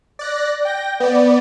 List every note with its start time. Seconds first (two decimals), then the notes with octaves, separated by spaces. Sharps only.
0.19 D5 F#6 A#6
0.65 G5 G6 A#6
1.00 B3 D5